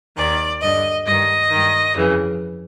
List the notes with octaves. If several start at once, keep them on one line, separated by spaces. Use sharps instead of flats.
D#2 D#3 D5
G2 D3 D#5
G2 D#3 D#5
G2 D#3
F2 C#3 E3